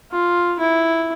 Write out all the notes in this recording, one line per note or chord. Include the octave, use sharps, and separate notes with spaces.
F4
E4